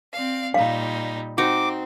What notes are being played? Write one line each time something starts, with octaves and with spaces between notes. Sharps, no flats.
C4 D5 F5
A#2 G3 D#4 F5
C4 D#4 F#4 D6